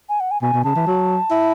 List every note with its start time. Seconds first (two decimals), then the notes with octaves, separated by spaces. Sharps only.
0.09 G#5
0.20 F#5
0.31 G#5
0.42 B2 G#5
0.54 B2
0.64 C#3 A5
0.76 E3
0.87 F#3
1.31 E4